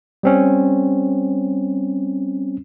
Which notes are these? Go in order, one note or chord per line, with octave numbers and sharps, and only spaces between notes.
G3 C4 C#4